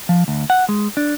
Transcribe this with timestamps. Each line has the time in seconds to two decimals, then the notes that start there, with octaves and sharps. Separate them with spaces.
0.09 F3
0.28 D2
0.50 F#5
0.69 G#3
0.97 D4